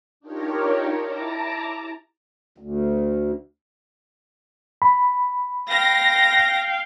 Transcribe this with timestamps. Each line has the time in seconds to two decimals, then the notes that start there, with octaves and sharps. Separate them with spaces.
0.20 D4 D#4 F4 G4 A#4 C#5
1.02 E4 A5 A#5 D6
2.58 D2
4.82 B5
5.70 F5 G5 A#6